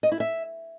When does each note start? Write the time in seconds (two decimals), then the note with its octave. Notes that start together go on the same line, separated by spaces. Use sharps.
0.03 D#5
0.12 E4
0.20 E5